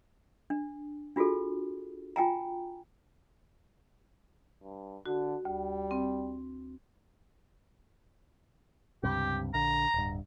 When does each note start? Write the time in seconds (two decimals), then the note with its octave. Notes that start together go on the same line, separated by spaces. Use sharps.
0.50 D4
1.16 D4 F4 F#4 G#4 A4
2.16 F4 G5 G#5 A#5
4.62 G2
5.06 D3 F#4
5.45 D2 G3
5.91 C4
9.03 C#2 G2 C3 G4
9.54 A#1 D3 A#5
9.94 D1 G2